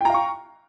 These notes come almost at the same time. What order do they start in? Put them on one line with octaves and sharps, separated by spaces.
G5 A#5 F5 C#6